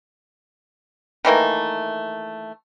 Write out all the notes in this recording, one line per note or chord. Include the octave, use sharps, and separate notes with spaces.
D#3 E3 A3 A#3